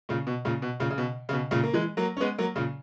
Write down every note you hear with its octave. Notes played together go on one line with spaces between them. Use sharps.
A#2 C#3
B2
A#2 C#3
B2
A#2 C#3
C#3
B2
C#3
B2
A#2 C#3
A#3
E3 G#3
F#3 A#3
C#4
G#3 B3
F#3 A#3
A#2 C#3